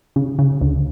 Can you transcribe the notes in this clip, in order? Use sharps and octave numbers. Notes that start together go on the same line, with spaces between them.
C#3
C#3
D2